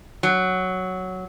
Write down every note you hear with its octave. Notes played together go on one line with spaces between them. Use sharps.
F#3